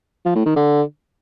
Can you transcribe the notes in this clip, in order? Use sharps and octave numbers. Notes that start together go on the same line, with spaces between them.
F3
A2
D#3
D3